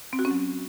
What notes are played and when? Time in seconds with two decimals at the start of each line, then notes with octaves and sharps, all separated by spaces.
0.13 C4
0.19 F#4
0.25 C#4
0.31 F#3